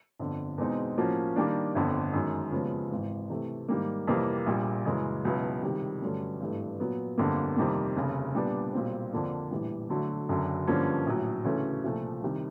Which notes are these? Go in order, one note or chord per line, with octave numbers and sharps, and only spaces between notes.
G1 F2 D3
E2 B2 G#3 C4 D#4
A2 F3 A#3 C#4 F#4
D#3 G3 A#3 D4
G1 F2 D3
F#2 D#3 G#3
D#2 C#3 F3 G#3 B3
G#1 G#2 E3
C3 E3 A3
G#2 D#3 G3 A#3
F2 C3 E3 G3 A#3
A#1 A#2 G3
F#2 C#3 E3 G#3
C#2 B2 F#3 B3 E4
C#2 C3 D#3 G3
G2 D3 F#3 A3 C#4
G#1 G2 E3 A3
A#2 F#3 B3
G1 F2 D3 G3 A#3
F2 C3 D#3 G3 A#3
F1 D#2 C#3
A#2 G3 B3 D4
B1 A#2 G3 C4
F2 D3 F3 A#3 D4
A#1 A2 E3 G3
D2 D3 F#3 A3
F#1 F#2 D3 F#3
G2 D3 F3 A#3 C#4
A#1 A2 F#3
D2 C#3 E3 A3 C#4
C2 A#2 F3 A3
C2 C3 D#3 G3